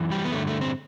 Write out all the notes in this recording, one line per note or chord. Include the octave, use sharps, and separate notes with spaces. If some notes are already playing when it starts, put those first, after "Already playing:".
Already playing: F#2 E3
G3
B3
G2 D3 A3
A3
C4